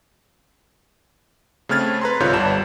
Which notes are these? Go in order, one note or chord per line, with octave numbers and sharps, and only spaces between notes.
C#3 A3 C4 F6 G#6 A6
B4 A#5 C6
C2 G#2 D3 F4 C#5 G6
G1 G3 A5 E7